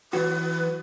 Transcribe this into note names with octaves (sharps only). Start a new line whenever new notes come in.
E3 F#3 F#4 B4